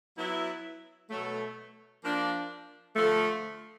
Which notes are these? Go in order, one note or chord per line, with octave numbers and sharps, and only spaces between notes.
F#3 B3 E4
B2 F#3 A3
F3 A#3 D4
D3 F3 A3